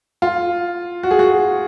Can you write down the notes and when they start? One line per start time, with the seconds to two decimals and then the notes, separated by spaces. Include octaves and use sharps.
0.22 F4
1.03 F#4
1.11 G#4
1.19 F#4